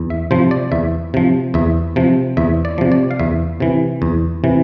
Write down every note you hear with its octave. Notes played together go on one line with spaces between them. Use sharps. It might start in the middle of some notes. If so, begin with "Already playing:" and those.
Already playing: E2
E5
C3 F3 C5
D5
E2 E5
C3 F3
E2 E5
C3 F3
E2 E5
D5
C3 F3
D5
F5
E2 E5
C3 E3
E2
C3 E3